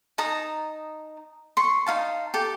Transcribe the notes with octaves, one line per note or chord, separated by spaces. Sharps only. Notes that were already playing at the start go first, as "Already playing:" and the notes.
D#4 A5 A#5 D#6
C6 C#6
D#4 F4 F5 A5
G4 A4